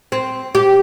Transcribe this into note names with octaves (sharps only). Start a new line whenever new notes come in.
C4
G4